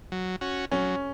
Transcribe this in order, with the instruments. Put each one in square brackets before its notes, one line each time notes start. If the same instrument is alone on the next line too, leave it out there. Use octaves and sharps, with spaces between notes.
[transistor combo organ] F#3
C#4 F#4
[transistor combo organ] F#3 [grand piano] C#4